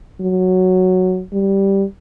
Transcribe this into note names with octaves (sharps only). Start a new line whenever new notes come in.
F#3
G3